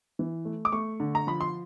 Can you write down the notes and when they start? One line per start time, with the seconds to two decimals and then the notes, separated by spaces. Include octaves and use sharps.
0.19 E3
0.45 A3
0.65 D6
0.72 A3 C#6
1.00 D3
1.15 A#5
1.27 F3 B5
1.41 C6